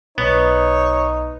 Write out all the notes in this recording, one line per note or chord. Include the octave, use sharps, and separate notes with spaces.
B1 B3 D#4 C#5